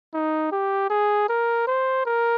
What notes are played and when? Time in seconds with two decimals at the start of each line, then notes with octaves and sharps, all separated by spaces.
0.14 D#4
0.52 G4
0.90 G#4
1.29 A#4
1.67 C5
2.06 A#4